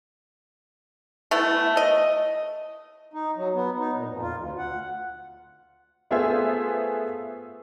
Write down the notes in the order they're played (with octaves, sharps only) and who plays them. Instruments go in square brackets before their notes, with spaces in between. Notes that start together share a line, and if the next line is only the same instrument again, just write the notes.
[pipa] A3 B3 E4
D#5
[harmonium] D#4
F#3
B3
D#4
A#2
F2
F4
D2
F#5
[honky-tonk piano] A3 B3 F4 G#4 C5 E5